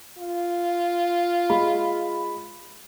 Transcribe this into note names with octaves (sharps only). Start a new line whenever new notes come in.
F4
G#3 B5